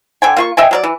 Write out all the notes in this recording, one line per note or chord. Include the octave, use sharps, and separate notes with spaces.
D3 G5 G#5
A#3 F4 C#6
D#5 E5 G5 G#5
F#3 A#4 D5
E3